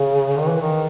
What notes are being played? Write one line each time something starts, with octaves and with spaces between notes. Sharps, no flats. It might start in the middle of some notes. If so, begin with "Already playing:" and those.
Already playing: C#3
D#3
E3
D#3